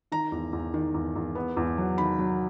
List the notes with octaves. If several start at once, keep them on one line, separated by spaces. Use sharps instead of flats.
D#3 A#5
E2
E2
D#3
E2
E2
B3
E2
F#3
D#3 B5
F#3